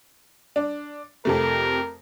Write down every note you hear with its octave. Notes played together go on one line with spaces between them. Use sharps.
D4
F2 C3 A3 A#4